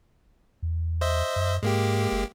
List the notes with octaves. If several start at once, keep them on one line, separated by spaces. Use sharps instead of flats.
E2
C5 D#5 E5
F#2
G#2 G#3 A#3 G4
F#1